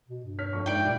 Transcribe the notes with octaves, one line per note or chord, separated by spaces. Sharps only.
B2
G2
C#5 F6 B6
F1 F2 C#6
G#2 E4 D5 G5
D#2 A#2 G3 G6